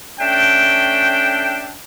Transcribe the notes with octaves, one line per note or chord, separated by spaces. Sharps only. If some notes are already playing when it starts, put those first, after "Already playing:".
A3 C#4 D4 E5 G5